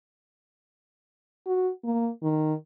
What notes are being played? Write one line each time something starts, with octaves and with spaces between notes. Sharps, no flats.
F#4
A#3
D#3